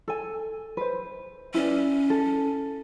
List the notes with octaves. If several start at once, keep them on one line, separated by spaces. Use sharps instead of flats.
A4 G#5
B4 C5
C#4 E4 B4 D5
A4